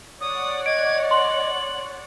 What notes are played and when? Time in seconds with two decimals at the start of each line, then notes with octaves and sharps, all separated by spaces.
0.21 C#5 D5 F#5 D#6
0.66 D#5 G#6 D7
1.11 C6 F#7